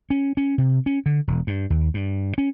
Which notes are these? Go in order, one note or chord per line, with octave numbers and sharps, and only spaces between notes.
C#4
C#4
C3
C#4
D3
E1
G2
D#2
G2
C#4